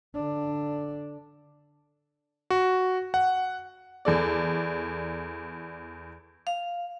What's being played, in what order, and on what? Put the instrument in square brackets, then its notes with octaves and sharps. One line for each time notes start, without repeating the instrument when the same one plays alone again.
[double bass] D3 D4
[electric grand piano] F#4
F#5
[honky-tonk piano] E2 A4 D5
[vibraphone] F5